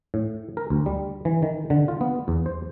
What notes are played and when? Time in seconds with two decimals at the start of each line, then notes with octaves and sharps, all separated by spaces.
0.14 A2
0.57 A#4
0.70 D2
0.86 G3
1.25 E3
1.43 D#3
1.70 D3
1.88 F4
2.01 B3
2.28 E2
2.46 C5